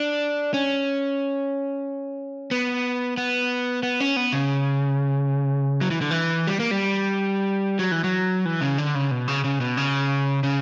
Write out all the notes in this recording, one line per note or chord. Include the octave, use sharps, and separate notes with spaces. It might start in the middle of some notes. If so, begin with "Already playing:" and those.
Already playing: D4
C#4
B3
B3
B3
C#4
B3
C#3
F#3
E3
D3
E3
G3
A#3
G3
F#3
E3
F#3
E3
C#3
D3
C#3
B2
C#3
C#3
B2
C#3
C#3